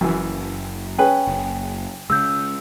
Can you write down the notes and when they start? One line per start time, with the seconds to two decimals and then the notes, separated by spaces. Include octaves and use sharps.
0.01 F#1 F#2 E3
0.98 C#4 G#4 B4 G5 G#5
1.27 F#1
2.10 C#3 G#3 E6 G6